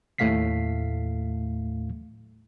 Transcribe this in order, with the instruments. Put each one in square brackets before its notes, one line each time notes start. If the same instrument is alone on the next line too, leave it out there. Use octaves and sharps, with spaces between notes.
[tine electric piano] D#2 A2 A3 F5 B6 C7